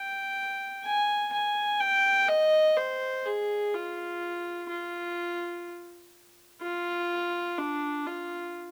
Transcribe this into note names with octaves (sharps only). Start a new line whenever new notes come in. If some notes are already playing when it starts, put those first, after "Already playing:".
Already playing: G5
G#5
G#5
G5
D#5
C5
G#4
F4
F4
F4
D4
F4